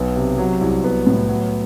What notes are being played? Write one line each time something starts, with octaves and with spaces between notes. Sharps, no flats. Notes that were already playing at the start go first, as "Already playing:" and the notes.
Already playing: B1 B3
C3
F#3
C2
B3
A2
F#3